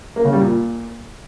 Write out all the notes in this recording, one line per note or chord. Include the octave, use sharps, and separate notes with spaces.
A#3
C#3
G3
A#2